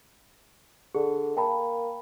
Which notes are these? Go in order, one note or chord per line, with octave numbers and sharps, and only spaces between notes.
D3 G#4
A#3 G5 A5 B5